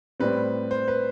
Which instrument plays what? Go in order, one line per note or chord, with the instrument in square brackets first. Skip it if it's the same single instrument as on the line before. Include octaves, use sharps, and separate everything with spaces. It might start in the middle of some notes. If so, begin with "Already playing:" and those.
[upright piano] A2 G3 C4 [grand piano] B4
[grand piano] C5
B4